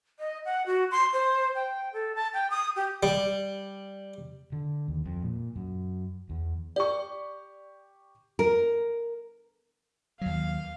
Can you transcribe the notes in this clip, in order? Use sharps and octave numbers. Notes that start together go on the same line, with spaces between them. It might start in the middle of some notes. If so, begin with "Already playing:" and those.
D#5
F#5
F#4
C6
C5
G5
A4
A5
G5
D#6
G4
G3
D3
D#2
F2
A#2
F#2
E2
G4 D5 C#6
A#4
D#2 F#3 F5